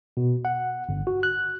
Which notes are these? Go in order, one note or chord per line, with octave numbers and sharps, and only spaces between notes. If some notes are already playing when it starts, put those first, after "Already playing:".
B2
F#5
G1
F#4
F#6